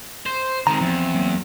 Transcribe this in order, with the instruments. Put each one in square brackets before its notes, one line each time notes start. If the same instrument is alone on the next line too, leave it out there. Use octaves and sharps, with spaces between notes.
[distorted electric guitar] C5
[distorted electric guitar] D#3 G#3 [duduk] C4 [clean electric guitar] A#5
[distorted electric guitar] E2 [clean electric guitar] F3
[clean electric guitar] F#3 A#3